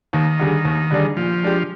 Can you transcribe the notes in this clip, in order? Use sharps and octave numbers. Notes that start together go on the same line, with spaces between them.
D#2 D#3
D3 G3 D4 G#4
D#2
D3 G3 D4 G#4
A#2 F3
G#3 D4 G4